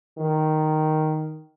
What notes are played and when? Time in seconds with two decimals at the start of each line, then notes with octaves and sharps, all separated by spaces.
0.18 D#3